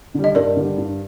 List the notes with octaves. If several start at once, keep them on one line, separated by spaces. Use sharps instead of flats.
D3 G3
D#5
G2 A#4 D5
D3 G3
G2